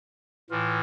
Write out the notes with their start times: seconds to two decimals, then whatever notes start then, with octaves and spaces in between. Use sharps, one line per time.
0.50 A2 E3 F4